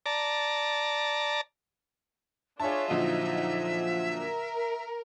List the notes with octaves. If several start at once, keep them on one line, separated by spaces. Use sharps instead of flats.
D5 A5 A#5
D4 F4 G#4 C#5 E5 A5
A#2 D3 F3 F#3 D#4 D#5
A#4